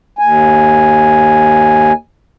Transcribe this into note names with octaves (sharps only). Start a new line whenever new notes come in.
D#2 G#5